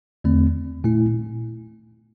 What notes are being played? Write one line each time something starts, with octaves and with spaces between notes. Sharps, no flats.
E2 D3 A3 C4
A#2 A3 E4